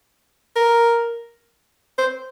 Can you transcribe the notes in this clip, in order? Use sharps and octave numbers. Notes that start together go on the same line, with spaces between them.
A#4
C5